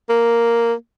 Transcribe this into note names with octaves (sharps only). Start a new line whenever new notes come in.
A#3